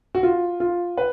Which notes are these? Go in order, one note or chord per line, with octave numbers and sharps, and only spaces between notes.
F#4
F4
F4
B4